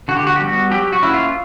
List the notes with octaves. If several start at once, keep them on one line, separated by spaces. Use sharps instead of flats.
D3 F#4
G4
F#4
G4
G3 B3 F#4
F#3 G4
F#4
A#3 C#4 E4
F4